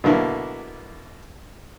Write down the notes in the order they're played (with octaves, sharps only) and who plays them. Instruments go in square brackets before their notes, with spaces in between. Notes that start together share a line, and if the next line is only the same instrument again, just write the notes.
[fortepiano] B2 D3 A#3 E4